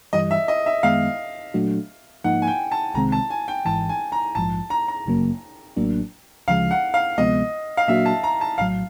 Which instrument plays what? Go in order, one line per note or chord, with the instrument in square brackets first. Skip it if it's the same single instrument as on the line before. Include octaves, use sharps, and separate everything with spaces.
[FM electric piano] G2 E3 G3 [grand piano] D#5
[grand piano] E5
D#5
E5
[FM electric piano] F#2 D#3 G#3 B3 [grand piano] F5
[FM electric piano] A#2 F#3 A3 D4 F#4
[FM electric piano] G#2 F3 A#3 D#4 [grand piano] F#5
[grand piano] G#5
G5
A5
[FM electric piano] C2 C3 D#3 G#3 C4 [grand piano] A#5
[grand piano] A5
G#5
G5
[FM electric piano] G#1 G#2 E3 [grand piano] A5
[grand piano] G#5
A#5
[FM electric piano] A#1 G#2 F3 [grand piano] A5
[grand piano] A#5
A#5
[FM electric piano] G1 F#2 C#3 F#3 A#3
A1 A2 F#3 A#3 D4
[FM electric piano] D2 C#3 F3 G#3 [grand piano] F5
[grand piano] F#5
F5
[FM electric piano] D2 C3 F3 G#3 B3 [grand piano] D#5
[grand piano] F5
[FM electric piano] A#2 F#3 A#3 D4 F#4 [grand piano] E5
[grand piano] A5
A#5
A5
[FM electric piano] A#1 A2 F#3 [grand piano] F5